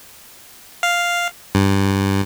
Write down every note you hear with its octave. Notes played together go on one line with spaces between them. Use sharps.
F5
G2